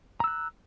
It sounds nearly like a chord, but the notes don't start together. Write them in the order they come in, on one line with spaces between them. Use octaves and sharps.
A#5 E6 F#6